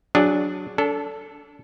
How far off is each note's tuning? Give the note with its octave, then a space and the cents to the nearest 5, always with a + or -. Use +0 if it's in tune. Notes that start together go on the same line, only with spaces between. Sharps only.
F#3 +0 D4 +0 G#4 -20
D4 -35 A4 +0